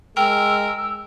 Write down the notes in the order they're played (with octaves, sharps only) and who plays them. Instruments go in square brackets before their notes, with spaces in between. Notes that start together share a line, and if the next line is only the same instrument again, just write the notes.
[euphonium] G#3 [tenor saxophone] A#4 [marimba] G5 [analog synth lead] E6